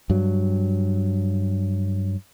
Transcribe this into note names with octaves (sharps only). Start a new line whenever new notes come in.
G2 F#3